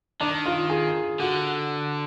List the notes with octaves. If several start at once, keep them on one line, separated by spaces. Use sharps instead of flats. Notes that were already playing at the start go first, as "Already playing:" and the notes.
D#3 D4
F4
G#4
D3 F#4